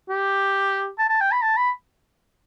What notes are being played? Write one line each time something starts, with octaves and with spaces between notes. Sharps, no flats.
G4
A5
A5
G5
B5
A5
B5